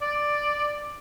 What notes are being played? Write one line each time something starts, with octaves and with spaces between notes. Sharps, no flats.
D5